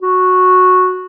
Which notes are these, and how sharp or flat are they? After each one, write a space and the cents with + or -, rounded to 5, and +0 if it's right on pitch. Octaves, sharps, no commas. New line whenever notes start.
F#4 -5